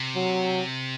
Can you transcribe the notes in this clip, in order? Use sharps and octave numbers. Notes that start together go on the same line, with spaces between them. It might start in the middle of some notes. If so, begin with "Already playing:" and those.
Already playing: C3
F#3